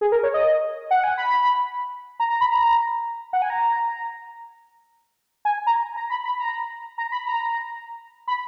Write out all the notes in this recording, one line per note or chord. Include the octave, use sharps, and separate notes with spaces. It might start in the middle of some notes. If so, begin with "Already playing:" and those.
G#4
A#4
C#5
D#5
F#5
G#5
B5
A#5
A#5
B5
A#5
F#5
G#5
A#5
G#5
A#5
A#5
B5
B5
A#5
A#5
B5
A#5
B5